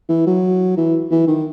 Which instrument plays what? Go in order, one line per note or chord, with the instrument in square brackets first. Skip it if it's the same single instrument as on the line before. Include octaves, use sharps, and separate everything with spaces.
[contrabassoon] E3
F#3
E3
E3
D#3